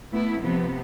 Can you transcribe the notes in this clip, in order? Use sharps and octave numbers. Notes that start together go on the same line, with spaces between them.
A3 B3 E4
C3 F3 B3